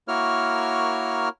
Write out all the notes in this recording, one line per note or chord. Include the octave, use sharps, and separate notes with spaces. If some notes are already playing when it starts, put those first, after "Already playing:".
A#3 E4 F#4 A#4 C#5 F6